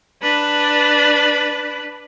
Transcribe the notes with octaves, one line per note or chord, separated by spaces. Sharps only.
D4 B4